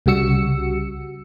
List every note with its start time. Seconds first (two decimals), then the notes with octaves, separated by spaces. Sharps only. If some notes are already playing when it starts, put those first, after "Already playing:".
0.06 C2 C#3 G3 F#4 E6 C#7